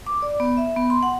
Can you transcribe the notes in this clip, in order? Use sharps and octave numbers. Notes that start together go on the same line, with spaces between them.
D6
D5
B3
E5
B3
C6
F#5